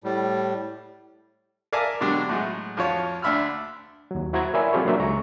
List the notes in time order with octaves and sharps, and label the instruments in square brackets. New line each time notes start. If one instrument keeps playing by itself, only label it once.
[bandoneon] A2 G3
[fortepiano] A#4 D5 E5 F5 G#5 A5
G#2 B2 D3 F#3 D4 G4
A2 F#3 G#3
F2 F3 F4 F#4 C#5
D2 D4 E5 B5 E6 F6
[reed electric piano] D#2 F#3
E4 F#4 C5 A#5 G#6
A#4 C#5 D5 E5 G#5 B5
F#3 C4 F4 G4 A4 C#5
F#3 A#3 D4 A4 C5 E5
C#2 G#3 A#5 C#6